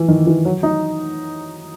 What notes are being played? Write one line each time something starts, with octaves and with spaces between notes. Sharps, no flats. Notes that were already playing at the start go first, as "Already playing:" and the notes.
Already playing: E3
D#3
E3
F#3
D#4